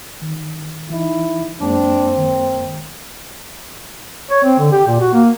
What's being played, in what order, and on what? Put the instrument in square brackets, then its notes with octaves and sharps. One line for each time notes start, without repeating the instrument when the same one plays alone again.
[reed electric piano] D#3
[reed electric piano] E3 D#4 [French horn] E4
[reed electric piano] F#2 G#3 A#3 [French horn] C4 [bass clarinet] D4
[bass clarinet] D#3
[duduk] C#5
C4
D3
G4
A#2
F#4
A#3